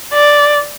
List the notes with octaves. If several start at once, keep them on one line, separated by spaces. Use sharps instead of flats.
D5